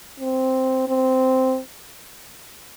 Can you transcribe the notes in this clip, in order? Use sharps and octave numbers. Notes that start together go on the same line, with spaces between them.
C4
C4